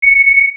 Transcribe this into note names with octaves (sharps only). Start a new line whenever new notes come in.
C#7